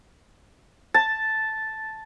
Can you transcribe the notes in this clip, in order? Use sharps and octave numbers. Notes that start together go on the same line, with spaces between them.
A5